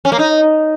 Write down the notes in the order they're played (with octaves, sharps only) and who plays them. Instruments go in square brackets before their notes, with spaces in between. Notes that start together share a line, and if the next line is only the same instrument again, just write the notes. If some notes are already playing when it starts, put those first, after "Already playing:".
[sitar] C#4
A#3
D#4